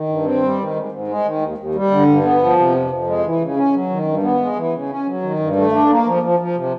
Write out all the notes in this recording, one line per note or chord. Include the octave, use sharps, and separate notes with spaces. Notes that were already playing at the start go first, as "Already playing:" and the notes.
Already playing: D#3
G2
C4
G3
D#3
G#2
G#2
G#3
D#3
D#2
D#2
G3
D3
G2
B3
F3
C3
F2
F2
G#3
E3
C#3
C#4
F#3
D#3
G2
B3
G#3
E3
C#3
C#4
F#3
D#3
G2
A3
D4
A#3
F3
F3
F3
C3